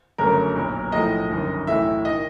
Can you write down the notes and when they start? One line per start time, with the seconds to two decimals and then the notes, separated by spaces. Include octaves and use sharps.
0.18 G1 F#2 C#3 F#3 A3 A#4
0.55 B1 A#2 F#3 B3
0.92 B1 A2 F3 A3 D#5
1.30 G1 F#2 D#3
1.67 B1 A2 E3 A3 E5
2.05 D#3 D#5